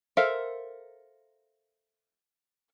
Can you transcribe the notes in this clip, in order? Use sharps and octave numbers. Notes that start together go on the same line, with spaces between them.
A4 A#4 C5 E5 F5